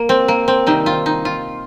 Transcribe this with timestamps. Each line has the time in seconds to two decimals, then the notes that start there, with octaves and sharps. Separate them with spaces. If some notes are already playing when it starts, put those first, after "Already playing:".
Already playing: A#3
0.09 C4
0.28 A#3
0.48 C4
0.67 C3 D#3 G3 D#4
0.86 F4
1.06 D#4
1.25 F4